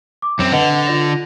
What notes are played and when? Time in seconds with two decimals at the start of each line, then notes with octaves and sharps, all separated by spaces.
0.22 D6
0.39 F#2 C4
0.52 D3 B4 D#5 F#5
0.87 F4 D5 A#6